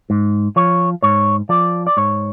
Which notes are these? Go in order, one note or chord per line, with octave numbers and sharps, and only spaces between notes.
G#2
F3 C#5
G#2 C#5
F3 D5
D5
G#2 C#5